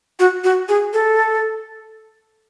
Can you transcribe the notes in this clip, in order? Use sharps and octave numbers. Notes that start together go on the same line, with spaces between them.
F#4
F#4
G#4
A4